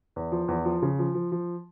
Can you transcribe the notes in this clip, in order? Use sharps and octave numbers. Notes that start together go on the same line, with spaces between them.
E2
F3
E2
F3
C#3
F3
F3
F3